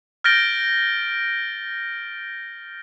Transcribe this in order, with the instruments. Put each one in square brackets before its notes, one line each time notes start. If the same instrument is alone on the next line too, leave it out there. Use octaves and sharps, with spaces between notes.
[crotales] F6 G6 A6 A#6 D7 G7